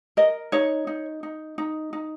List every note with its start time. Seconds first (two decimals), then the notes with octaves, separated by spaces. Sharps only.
0.17 A#4 D#5
0.52 D#4 C#5
0.87 D#4
1.23 D#4
1.58 D#4
1.93 D#4